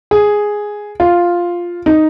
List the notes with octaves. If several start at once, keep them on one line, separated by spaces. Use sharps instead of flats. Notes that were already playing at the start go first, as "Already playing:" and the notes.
G#4
F4
D#4